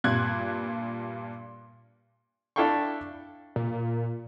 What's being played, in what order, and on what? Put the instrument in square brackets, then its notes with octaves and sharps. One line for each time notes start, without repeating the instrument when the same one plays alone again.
[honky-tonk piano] G2 A#2 F#6 G#6
[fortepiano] D4 E4 A4 F5 G5 C#6
[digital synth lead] A#2